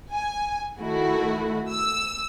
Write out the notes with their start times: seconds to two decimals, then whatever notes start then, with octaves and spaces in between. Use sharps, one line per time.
0.12 G#5
0.80 D#3 A3 E4 F#4
1.71 E6